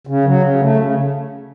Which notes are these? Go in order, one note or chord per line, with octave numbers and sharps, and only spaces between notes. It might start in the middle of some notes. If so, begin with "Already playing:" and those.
C#3
F#3
C#3
A3
C#3